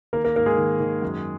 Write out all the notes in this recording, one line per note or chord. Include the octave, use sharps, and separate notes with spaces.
D#3 A#3 A#4
A#3 A#4
G#2 A#3 A#4
G#3 G#4
D#3
D#3
F#2